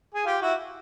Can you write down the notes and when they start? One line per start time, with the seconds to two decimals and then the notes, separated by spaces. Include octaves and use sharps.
0.14 G#4
0.25 F4 G4
0.42 E4 F#4